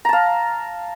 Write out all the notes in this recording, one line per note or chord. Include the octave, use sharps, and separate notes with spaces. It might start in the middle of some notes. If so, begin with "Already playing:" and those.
F5 A5 A#5